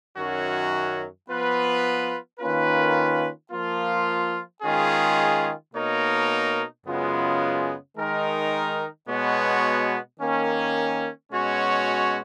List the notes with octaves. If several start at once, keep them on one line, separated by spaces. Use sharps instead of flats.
F#2 D#3 F#3 C#4 F#4
F3 B3 F4 B4
D#3 A#3 C#4 F4 B4
F3 A#3 F4
D#3 G#3 C#4 F4 G#4
B2 A#3 D#4 A#4 C#5
F#2 C#3 G#3 B3 F4
D#3 G#3 D#4 A#4
B2 G#3 B3 F#4 C#5
D#3 A#3 C#4
B2 G#3 C#4 F#4 C#5